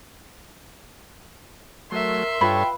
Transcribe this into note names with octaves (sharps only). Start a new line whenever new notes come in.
F#3 A3 A#4 E5 C6
G2 F4 A4 B4 C#5 G5 B5